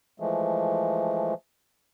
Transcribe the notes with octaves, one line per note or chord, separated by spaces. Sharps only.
E3 F3 G#3 A3